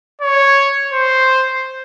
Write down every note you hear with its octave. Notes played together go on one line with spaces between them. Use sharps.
C#5
C5